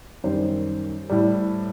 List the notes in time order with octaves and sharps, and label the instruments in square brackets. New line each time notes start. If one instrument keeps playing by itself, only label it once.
[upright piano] F#2 D#3 G3 C5
A2 G3